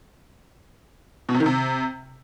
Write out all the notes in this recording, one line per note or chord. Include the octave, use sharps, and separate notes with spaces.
B2
C3
D#3
C3